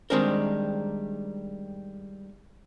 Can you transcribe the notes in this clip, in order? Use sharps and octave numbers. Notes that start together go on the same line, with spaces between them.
D#3 G3 G#3 C4 D4 A#4